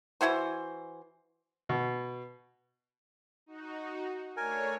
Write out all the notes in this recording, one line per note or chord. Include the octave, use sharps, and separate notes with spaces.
E3 E4 F#4 C5
B2
D#4 F#4
A3 D4 A#4 C#5 G#5